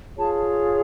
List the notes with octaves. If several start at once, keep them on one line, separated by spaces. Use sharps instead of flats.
F4 G#4 C#5 A5